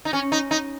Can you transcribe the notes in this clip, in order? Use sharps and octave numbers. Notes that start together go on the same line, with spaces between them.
D#4
C#4
D#4
D#4